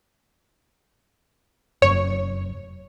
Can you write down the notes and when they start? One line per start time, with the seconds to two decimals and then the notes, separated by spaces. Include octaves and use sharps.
1.82 F1 F#2 C#5